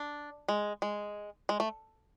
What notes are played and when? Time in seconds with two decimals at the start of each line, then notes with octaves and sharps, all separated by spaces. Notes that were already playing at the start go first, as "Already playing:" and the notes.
Already playing: D4
0.48 G#3
0.82 G#3
1.49 G#3
1.60 A3